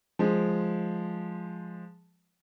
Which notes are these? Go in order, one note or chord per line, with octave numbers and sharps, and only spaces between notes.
F3 G#3